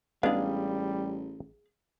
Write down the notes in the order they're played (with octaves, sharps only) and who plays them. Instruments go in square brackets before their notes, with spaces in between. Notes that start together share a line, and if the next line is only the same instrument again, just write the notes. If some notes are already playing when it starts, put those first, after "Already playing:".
[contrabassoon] A1 [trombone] G3 [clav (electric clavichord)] G#3 B3 D4 [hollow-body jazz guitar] G#4 F5